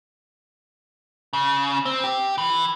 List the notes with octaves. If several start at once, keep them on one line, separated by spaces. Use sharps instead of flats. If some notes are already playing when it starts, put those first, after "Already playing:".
C#3
C4
G4
E3